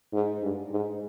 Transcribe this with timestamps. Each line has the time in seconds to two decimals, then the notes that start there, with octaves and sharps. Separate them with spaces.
0.13 G#2
0.42 G2
0.71 G#2